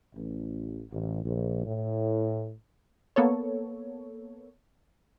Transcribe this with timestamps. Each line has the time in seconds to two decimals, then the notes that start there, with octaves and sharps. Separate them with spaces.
0.13 A1
0.91 A1
1.24 A#1
1.63 A2
3.16 A#3 B3 A4 C#5